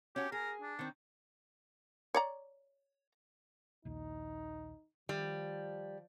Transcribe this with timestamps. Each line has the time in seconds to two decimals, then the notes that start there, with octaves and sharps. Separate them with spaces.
0.16 C#4 F#4 G4
0.32 G#4 A#4
0.61 D4
0.79 D#3 C4
2.14 C#5 D5 A#5
3.85 A#1 D#2 D#4
5.09 D#3 F3 G3